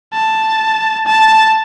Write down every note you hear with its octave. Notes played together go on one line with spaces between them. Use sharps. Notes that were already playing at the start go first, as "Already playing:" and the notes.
A5
A5